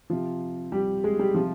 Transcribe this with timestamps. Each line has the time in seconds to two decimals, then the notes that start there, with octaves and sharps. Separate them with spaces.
0.10 C3 F3 F4
0.72 G3 G4
1.04 G#3 G#4
1.19 G3 G4
1.34 C3 F3 F4